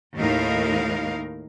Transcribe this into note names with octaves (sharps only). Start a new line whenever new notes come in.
D#2 A2 D#4 A#4 F5